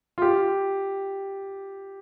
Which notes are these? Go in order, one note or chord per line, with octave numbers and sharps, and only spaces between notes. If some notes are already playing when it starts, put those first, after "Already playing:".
F4
G4